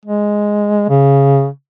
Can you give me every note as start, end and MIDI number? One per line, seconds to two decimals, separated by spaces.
0.06 0.88 56
0.89 1.47 49